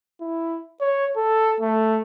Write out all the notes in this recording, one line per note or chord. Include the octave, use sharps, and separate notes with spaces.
E4
C#5
A4
A3